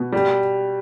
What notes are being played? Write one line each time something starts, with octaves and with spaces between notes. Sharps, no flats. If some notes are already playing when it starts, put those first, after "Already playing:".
Already playing: B2
G3